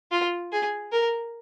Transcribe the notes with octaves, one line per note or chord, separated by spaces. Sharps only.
F4
G#4
A#4